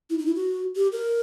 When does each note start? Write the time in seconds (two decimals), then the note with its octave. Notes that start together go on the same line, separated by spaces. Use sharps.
0.10 E4
0.19 D#4
0.26 E4
0.35 F#4
0.76 G4
0.92 A#4